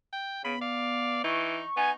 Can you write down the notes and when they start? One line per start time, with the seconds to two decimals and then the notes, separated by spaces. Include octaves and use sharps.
0.12 G5
0.44 C#3 B3 B5
0.61 D5 F5
1.24 E3 D#4 C#6
1.77 B3 D#4 G#5